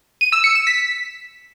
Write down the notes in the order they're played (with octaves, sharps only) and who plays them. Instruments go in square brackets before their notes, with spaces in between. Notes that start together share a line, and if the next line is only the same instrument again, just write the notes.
[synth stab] D#7
E6
C#7
E7
B6